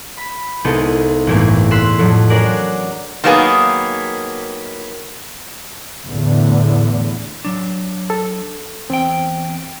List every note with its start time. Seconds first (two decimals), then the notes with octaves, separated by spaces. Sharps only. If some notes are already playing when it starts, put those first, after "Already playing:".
0.17 B5
0.64 C2 G#3 B3 D#4 A4
1.27 G1 E2 A2 A3 A#3 E4
1.71 C6 E6 F#6 B6 C7 E7
1.98 F2 A2 F#3
2.30 C#4 D4 F#4 G#4 A#4 D5
3.24 D#3 F#3 A#3 B3 G#4
6.07 E2 A2 D3
7.45 F#3 D4
8.10 A4
8.90 E2 C4 G5